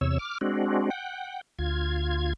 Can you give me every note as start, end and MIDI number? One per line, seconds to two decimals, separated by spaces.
0.01 0.18 40
0.01 0.18 48
0.01 0.18 73
0.01 0.18 88
0.19 0.38 86
0.19 0.38 89
0.41 0.90 56
0.41 0.90 60
0.41 0.90 62
0.41 0.90 66
0.90 1.41 78
0.90 1.41 79
1.59 2.33 38
1.59 2.33 65
1.59 2.33 92